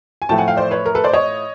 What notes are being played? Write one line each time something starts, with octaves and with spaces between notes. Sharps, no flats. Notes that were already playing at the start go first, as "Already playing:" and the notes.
G#5
A2 F3 A3 G5 A5
F#5 G#5
F5 G5
C5 D5
B4 C#5
A#4
A4 B4
C5 D5
C#5 D#5